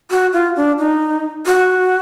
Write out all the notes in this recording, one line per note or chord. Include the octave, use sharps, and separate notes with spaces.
F#4
F4
D4
D#4
F#4